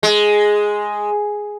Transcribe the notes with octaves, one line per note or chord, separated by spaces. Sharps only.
G#3